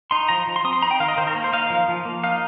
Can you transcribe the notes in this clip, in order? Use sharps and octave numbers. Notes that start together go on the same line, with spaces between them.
D#4 C6
F3 A#5
F3
C6
C4 D#6
C6
D#4 A#5
G5
D#3 F5
D#5
D#3 C5
A#4
A#3
C5
D#4 F5
F3
F3
A#3
D#4 F5